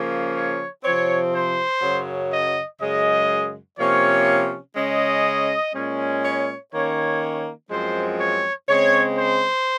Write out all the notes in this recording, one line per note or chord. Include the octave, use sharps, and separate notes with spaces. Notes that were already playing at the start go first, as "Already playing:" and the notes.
Already playing: C#3 F3 A#3 C#4
C#5
C3 F3 C4 C#5
C5
F#2 C#3 F#3
D#5
F#2 C#3 G#3 D#5
C3 F3 A#3 C#4 C#5
C#3 G#3 C#4 D#5
A#2 G#3 C#4
C#5
D#3 A#3 C#4 C#5
F#2 F3 G#3 C4 C5
C#5
C#3 G#3 C4 C#5
C5